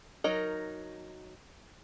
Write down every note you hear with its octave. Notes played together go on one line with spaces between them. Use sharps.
F#3 D#4 A#4 D#5